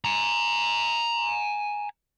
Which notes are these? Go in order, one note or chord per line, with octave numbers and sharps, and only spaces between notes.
G#5 A#5